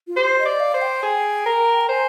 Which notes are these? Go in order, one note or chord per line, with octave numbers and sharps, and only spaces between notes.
F4
G4 C5
D#5
D5
F5
C5
G5
G#4
A#4
A#5
C5 G#5